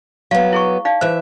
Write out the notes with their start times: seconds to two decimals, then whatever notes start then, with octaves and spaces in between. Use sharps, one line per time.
0.31 F#3 B3 F5
0.53 E4 G#4 C#6
0.85 D#4 D5 F5
1.01 E3 C5 E5